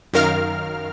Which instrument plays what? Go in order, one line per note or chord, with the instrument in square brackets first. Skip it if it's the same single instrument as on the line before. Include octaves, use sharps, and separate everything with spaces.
[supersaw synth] F#2 D#3 A#4 F5 F6